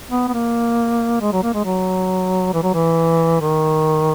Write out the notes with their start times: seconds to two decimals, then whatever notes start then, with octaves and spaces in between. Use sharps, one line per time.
0.11 B3
0.28 B3
0.34 A#3
1.21 G#3
1.33 F#3
1.43 A#3
1.54 G#3
1.65 F#3
2.54 E3
2.63 F#3
2.74 E3
3.41 D#3